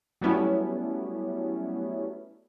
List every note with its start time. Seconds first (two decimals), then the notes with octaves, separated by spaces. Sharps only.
0.21 F#3 G3 A3 B3 C#4 E4